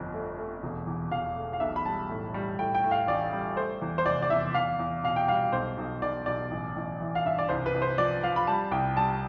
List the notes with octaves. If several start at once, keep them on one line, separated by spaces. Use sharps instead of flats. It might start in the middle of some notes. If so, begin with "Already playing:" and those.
Already playing: G1 F2
A3
A3
E1
E2
E1 F5
A3
F5
B1 E5
B5
G3 A5
A2
G3
A2 G5
G5
A2
F5
A1 D5
G3
A3 C5
E2
C5
F1 D5
D5
E2 E5
E2 F5
E2
B2 F5
G5
G3 F5
B1 C5
B1
B1 D5
B1 D5
A1
A1
E3
F5
G2 E5
D5
C2 C5
B4
C2
C5
F3 D5
F3 F5
B5
G3 A5
C2 G5
G3 A5